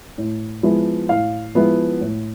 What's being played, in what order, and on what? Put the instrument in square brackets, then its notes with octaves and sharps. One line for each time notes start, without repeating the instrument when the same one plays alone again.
[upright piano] A2
F3 G#3 B3 E4
A2 F5
F3 G#3 B3 E4
A2